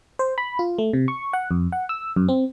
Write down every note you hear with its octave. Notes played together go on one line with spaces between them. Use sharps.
C5
B5
F4
A3
C3
C#6
F#5
F2
F#5
E6
F#2
C4